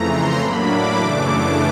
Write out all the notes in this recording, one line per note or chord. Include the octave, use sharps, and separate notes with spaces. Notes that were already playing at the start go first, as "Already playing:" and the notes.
Already playing: F2 C#3 E3 A3 A#5
C6
A2 F#3 A#3 D4 B5
D6
F#2 C#3 E3 A3 D4